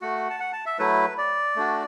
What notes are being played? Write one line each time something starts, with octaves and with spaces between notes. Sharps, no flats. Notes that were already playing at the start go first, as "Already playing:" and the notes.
A3 F#4 F#5
A5
F#5
A5
E5
F#3 A3 E4 B4
D5
A3 D4 F#4